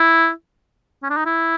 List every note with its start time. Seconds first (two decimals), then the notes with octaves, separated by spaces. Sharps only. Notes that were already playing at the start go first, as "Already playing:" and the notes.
Already playing: E4
1.03 C#4
1.10 D4
1.17 D#4
1.25 E4